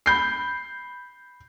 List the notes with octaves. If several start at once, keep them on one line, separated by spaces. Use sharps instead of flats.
B5 G6 C7